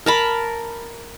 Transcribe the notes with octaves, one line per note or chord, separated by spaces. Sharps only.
A#4 A5 B5